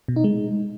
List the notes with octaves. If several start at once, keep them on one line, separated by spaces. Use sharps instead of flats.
B2
D#4
G#3